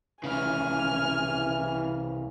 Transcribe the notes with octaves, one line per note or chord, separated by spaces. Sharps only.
C2 C#3 E3 G#5 F6